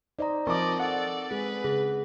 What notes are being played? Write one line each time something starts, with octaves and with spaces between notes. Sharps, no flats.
D#4 C5 D5 D#5 A#5
F3 C4 A#4 D5 D#5 C#6 D6
A4 D5 F#5
G#3 C4 G#4 B4
C#3 G#4